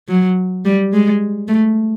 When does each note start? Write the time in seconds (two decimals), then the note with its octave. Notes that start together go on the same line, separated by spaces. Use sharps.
0.08 F#3
0.65 G3
0.93 G#3
1.48 A3